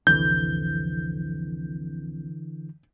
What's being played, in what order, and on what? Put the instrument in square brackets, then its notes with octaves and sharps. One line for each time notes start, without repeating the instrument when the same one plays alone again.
[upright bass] C2 F2 [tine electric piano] D3 E3 [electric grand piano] G6